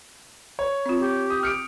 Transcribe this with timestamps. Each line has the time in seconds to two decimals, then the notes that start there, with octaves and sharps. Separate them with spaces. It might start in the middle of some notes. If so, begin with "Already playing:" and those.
0.59 C#5
0.86 C4 F4
1.00 G4
1.30 D#6
1.43 F6 C#7 D7